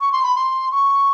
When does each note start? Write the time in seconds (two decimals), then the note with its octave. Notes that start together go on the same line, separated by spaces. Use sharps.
0.01 C#6
0.12 C6
0.23 B5
0.36 C6
0.72 C#6